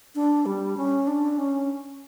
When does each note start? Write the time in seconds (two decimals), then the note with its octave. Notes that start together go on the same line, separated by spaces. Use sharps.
0.15 D4
0.46 G3
0.77 C#4
1.07 D4
1.38 C#4